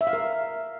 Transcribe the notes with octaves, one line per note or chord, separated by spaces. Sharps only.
E5
F5
A#4